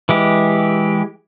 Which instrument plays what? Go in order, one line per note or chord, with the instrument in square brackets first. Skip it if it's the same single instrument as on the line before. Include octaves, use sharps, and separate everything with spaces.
[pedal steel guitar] E3 G#3 G4